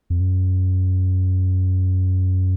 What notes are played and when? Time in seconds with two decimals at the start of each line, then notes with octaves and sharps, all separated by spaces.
0.10 F2
0.20 F#2